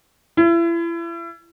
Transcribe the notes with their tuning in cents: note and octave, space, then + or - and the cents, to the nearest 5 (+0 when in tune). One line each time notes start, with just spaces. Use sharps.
E4 +35